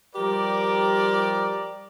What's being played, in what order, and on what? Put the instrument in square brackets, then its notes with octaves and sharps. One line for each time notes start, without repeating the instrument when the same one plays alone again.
[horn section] F3 G3 G4 A#4 D5